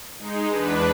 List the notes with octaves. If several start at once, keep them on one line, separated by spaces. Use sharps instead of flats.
G#3 D#4
E2 D4 B4